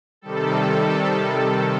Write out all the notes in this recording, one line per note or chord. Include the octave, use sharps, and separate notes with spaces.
C3 D#3 G3 A4